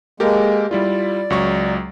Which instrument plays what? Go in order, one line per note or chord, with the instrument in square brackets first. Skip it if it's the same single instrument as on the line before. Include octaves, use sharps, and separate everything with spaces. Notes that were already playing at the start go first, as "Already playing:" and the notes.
[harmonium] G#3 A#3 [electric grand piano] G4 A4 A#4
[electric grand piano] G3 E4 F4 [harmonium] D5
[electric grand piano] C#2 F#3 C#6